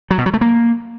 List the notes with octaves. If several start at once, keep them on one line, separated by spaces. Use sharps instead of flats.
F#3
B2
F#3
A3
A#3